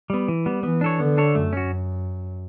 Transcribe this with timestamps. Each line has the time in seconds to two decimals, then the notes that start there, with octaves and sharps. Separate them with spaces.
0.10 G3 B3
0.28 E3
0.46 G3 B3
0.63 E3 B3
0.81 D4 A4 C#5
0.99 D3 B3
1.17 D4 A4 C#5
1.35 F#2 A3
1.53 C#4 F#4